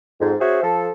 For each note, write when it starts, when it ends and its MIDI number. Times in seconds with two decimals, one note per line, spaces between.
0.20 0.33 41
0.20 0.33 44
0.40 0.60 61
0.40 0.60 66
0.40 0.60 68
0.40 0.60 72
0.40 0.60 73
0.40 0.60 76
0.63 0.90 53
0.63 0.90 69